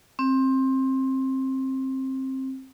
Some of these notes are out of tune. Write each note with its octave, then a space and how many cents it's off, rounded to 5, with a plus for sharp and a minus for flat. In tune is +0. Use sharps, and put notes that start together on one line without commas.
C4 +20